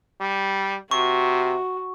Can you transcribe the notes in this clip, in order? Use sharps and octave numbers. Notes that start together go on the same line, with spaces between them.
G3
C3 F#4 C#6